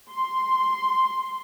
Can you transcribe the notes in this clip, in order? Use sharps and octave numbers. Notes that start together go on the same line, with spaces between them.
C6